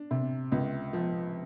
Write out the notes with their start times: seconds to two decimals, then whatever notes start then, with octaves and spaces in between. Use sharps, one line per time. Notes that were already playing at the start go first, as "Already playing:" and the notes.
Already playing: D4
0.11 C3
0.52 C#2
0.93 F3